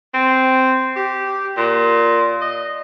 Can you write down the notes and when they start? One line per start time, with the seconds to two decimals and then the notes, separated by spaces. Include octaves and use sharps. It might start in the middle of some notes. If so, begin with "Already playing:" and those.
0.14 C4
0.96 G4
1.57 A#2
2.41 D#5